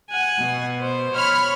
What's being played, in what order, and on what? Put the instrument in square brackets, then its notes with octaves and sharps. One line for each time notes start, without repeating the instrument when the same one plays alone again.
[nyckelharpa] F#5 G#5
[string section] B2
[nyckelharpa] C5
[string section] C#5 B5 F6